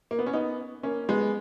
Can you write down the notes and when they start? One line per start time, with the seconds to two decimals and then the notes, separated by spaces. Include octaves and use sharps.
0.11 A#3
0.19 B3
0.26 C#4
0.33 B3 D#4
0.83 A#3 C#4
1.09 G#3 B3